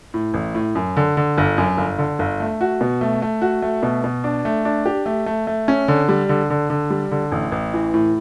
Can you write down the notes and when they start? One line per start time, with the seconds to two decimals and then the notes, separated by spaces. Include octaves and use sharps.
0.14 A2
0.34 A1
0.55 A2
0.75 F#2
0.97 D3
1.17 D3
1.38 G1
1.58 F#2
1.77 G1
1.98 D3
2.19 G1
2.40 A3
2.61 F#4
2.81 B2
3.01 A3
3.22 A3
3.42 F#4
3.62 A3
3.83 B2
4.04 B2
4.24 D4
4.45 A3
4.65 D4
4.86 G4
5.06 A3
5.26 A3
5.47 A3
5.68 C#4
5.88 D3
6.09 G3
6.29 D3
6.50 D3
6.70 D3
6.90 G3
7.11 D3
7.32 A1
7.52 A1
7.74 E3
7.94 A2